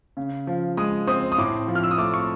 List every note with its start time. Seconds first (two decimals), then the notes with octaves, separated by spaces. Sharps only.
0.17 C#3
0.47 F3
0.77 G#3 D#6
1.08 C4 D#6
1.32 D#6
1.38 A2 D6
1.68 F3
1.75 F6
1.83 E6
1.91 D#6
1.98 A3 D6
2.14 C#6